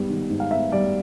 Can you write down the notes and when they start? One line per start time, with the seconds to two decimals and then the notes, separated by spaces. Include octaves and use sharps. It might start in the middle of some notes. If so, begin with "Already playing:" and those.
Already playing: G#2 G3 B3
0.09 D#3
0.30 G#2
0.40 F5
0.51 B3 E5
0.72 G3 D5